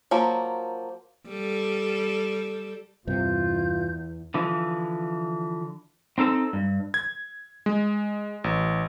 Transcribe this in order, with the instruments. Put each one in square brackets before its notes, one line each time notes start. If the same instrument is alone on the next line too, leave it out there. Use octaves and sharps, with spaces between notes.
[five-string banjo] F3 F#3 A#3
[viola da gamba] G3 A4
[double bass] E2 [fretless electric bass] G2 C3 [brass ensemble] F4 [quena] G6
[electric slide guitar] D3 E3 F3
C4 D#4 A4 A5
G2
[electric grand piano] G#6
G#3
A1